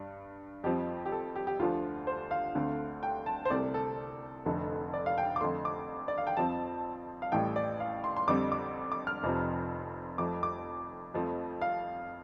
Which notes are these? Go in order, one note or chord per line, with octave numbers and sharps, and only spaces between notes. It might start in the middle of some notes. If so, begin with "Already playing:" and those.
Already playing: G2 G3
F2 F3 C4 G4
G4
A4
G4
G4
D2 D3 F3 F4
C5
F5
D2 D3 A3 C4
G5
A5
C5
C2 C3 A3 C4 D5
A4
F1 F2 D3 A3
D5
F5
G5
D6
F2 D3 A3 C6
D6
D5
F5
G5
F2 F3 C4 A5
F5
A1 A2 G3 G5
D5
F5
C6
C6
F2 D3 G3 C4 D6
D6
D6
F6
F1 F2 C3 F3 C4
F2 F3 A3 D6
D6
F2 F3 A3 C4
F5